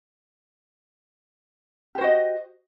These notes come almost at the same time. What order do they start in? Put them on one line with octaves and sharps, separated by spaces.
G4 C5 F#4 D#5